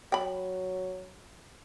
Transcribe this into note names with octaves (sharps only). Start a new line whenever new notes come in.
F#3 G5 B5